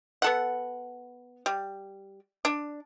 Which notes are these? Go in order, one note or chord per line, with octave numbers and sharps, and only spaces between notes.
B3 A4 F#5
G3
D4